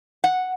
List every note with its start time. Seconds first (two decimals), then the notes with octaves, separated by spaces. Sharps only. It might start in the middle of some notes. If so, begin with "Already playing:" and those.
0.24 F#5